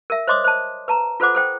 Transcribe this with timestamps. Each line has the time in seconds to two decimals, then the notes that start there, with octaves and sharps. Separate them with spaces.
0.10 A#4 E5
0.27 C5 C#5 D#5 C6 D6 D#6
0.44 C5 A5
0.88 B4 A5 A#5
1.20 F4 A4 B4 C5 F#5 D6
1.35 A4 C5 G5